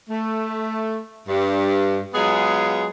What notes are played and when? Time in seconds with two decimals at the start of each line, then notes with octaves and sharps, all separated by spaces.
0.09 A3
1.28 G2
2.14 F#3 G#3 B3 F4 G#4